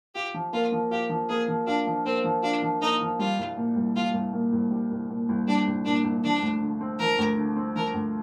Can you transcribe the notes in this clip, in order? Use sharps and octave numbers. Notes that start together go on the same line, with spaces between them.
F4 G4
F3
A#3 F4
F3
F4 G4
F3
A#3 G#4
F3
D4 F4
F3
A#3 C4
F3
D4 F4
F3
A#3 D#4
F3
G3 F4
C2
A#2
C2
G3 F4
C2
A#2
C2
G3
C2
A#2
C2
G3 D4
C2
A#2 D4
C2
F3 D4
D2
D3
C4
F3 A#4
D2
D3
C4
F3 A#4
D2